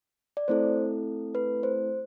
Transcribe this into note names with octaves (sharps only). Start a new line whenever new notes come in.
D5
A3 C4 E4 A4 C5
B4
C5